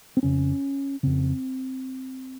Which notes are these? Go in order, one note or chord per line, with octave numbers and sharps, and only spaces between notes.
C4
F2 C#3 C#4
F2 C#3 C4